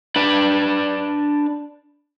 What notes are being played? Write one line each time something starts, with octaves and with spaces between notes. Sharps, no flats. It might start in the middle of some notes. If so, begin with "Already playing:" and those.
D4 B4